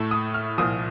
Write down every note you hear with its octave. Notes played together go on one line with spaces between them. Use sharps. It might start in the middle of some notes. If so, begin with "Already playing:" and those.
Already playing: A2 A3
D#6
F6
C2 A#2 F3 D#6